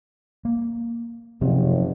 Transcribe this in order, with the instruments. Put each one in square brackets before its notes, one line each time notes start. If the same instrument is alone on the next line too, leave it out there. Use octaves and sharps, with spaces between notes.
[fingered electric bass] A#3
[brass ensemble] F#1 [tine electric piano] C3 [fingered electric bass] F3 F#3 C4